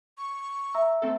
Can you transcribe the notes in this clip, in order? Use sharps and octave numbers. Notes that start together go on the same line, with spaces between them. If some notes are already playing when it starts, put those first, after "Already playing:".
C#6
E5 A#5 E6
A3 C4 A4